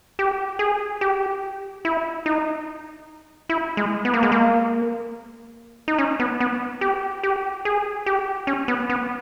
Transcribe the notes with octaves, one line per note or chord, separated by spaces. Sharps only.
G4
G#4
G4
E4
D#4
E4
G#3
B3
A#3
G#3
A#3
D#4
C#4
B3
B3
G4
G4
G#4
G4
C#4
B3
B3